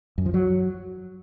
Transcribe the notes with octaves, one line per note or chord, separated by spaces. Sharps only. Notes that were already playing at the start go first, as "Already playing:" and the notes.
F#2
F3
F#3